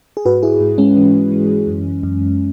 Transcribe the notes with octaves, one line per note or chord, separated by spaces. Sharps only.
G#4
G#2 F#4 B4
E4 G#4
G#2
G#3 C#4
E3
E3
F#2
F#2